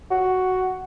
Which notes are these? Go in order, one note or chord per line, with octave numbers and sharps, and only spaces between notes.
F#4